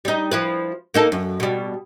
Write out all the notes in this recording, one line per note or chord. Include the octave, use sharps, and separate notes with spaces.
G3 D#4
F3 E4 B4
A#3 D#4 A4
F#2
B2 G3